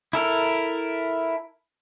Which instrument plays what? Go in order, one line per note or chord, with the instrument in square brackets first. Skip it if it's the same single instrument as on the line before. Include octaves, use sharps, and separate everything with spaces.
[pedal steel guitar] E4 A4 A#4